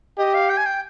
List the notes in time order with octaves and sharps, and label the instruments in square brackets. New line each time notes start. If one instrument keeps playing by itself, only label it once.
[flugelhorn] G4 [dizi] D#5
[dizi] F5
G5
G#5
G5